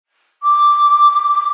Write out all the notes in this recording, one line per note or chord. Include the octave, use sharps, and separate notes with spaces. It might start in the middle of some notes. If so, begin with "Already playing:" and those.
D6